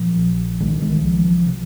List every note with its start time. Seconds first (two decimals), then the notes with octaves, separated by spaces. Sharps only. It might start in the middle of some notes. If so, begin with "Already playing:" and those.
Already playing: A#2 F3
0.17 A#1
0.60 C2 D#3 G#3
0.82 D#3 G#3
0.92 D#3
1.03 C2 F3
1.24 F3
1.46 C3 F3